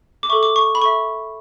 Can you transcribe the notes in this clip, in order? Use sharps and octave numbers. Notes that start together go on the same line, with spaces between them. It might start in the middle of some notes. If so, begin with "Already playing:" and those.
D6
A4 E5 C#6
D6
C#6
B5
A4 E5 C#6